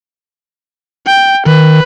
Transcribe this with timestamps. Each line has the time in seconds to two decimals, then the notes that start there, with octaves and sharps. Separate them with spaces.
1.07 G5
1.46 D#3 B4